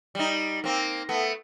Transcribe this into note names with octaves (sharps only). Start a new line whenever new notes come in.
G3 D#4
A#3 C4
A3 B3